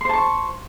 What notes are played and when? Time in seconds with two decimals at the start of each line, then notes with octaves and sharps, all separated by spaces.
0.01 C6
0.05 C5
0.09 A5
0.13 C#6